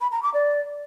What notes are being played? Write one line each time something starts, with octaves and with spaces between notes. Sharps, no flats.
B5
A#5
D6
D5